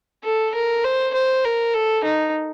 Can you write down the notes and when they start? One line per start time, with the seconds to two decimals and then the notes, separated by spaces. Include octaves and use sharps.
0.24 A4
0.54 A#4
0.84 C5
1.14 C5
1.44 A#4
1.74 A4
2.04 D#4